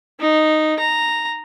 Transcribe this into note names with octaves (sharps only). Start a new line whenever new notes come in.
D#4
A#5